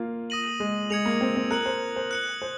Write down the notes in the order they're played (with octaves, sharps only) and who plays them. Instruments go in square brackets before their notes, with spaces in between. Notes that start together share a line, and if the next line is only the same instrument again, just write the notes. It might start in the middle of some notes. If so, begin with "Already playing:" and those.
Already playing: [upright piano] A#3 F4
[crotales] D#6 A#6 D#7 F#7
[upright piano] G#3
[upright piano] G#3 [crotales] D#6 G#6 C#7 F7
[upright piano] A#3
C4
C4
[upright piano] A#4 [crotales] F#6 C#7 F#7
[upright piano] C5
C5
[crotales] F#6 C#7 F#7
[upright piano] C5